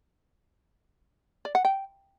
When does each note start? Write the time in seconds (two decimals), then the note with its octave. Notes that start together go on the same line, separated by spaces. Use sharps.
1.45 D5
1.55 F#5
1.65 G5